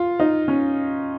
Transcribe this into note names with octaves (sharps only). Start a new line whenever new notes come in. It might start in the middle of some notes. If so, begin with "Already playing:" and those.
Already playing: F4
D#4
C#4